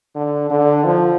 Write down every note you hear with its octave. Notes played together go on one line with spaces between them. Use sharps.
D3
D3
F3